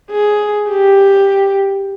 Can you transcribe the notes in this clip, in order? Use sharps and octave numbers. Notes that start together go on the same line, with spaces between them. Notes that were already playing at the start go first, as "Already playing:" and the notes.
G#4
G4